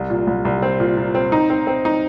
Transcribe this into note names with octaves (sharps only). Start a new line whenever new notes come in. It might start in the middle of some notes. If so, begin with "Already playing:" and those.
Already playing: C2
A#2
C2
C2
C4
A#2
A#2
C4
D#4
C4
C4
D#4